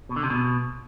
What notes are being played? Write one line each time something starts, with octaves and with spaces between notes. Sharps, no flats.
B2
D3
C3
B2